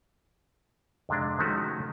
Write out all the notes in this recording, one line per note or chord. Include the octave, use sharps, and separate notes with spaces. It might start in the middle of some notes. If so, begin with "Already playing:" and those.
F2 C3 G#3 D4
D#3 F3 G#3 A3 C#4 F#4